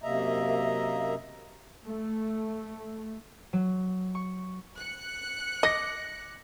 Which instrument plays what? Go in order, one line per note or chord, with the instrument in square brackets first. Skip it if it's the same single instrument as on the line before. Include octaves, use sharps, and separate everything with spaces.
[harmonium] F#2 C3 A#3 D#5 E5 A#5
[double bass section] A3
[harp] F#3
C#6
[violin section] F#6 C#7
[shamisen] D#5 [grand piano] D6 A#6